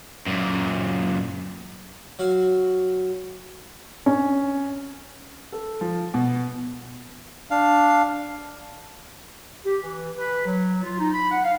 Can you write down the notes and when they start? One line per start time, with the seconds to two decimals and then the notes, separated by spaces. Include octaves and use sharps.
0.27 F#2 A#2
2.19 F#3 F#4 F5
4.06 C#4
5.52 A4
5.81 F3
6.14 B2
7.51 D4 F5
9.65 G4
9.81 E3
10.18 B4
10.45 F#3
10.83 F4
10.99 D#4
11.12 B5
11.30 F#5
11.44 F5